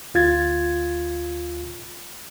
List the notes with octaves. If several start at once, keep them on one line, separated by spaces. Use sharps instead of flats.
D2 F4 G#6 A6